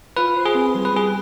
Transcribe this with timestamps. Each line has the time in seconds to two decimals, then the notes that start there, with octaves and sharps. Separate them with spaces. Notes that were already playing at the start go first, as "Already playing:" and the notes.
0.17 F4 B4
0.36 C5
0.45 G#4
0.54 C4
0.75 G3
0.85 B4
0.93 B3 G#4